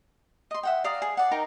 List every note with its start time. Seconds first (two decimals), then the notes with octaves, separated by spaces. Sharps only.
0.51 D#5 C6
0.63 E5 F#5 G5
0.84 D5 F5 A#5 D#6
1.02 G#4
1.17 D5 F#5
1.31 D#4 A#4 G5 A#5